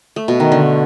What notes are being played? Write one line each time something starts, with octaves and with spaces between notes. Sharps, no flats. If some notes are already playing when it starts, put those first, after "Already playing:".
A3
B2
D#3
D3